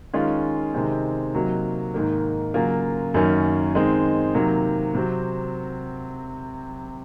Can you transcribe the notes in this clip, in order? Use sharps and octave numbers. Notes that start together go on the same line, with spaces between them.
D#3 G#3 C#4 F4
C3 D#3 G#3 C4
C3 F#3 A#3 D#4 F#4
G#2 D#3 A#3
C#3 F#3 A#3 F4
F#2 D#3 A#3 C#4
D#3 G#3 C4 D#4
C3 D#3 F#3 A#3
C3 F#3 C4 F#4